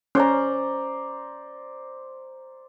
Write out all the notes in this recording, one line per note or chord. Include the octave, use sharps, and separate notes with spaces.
C#4 C5 D5 A#5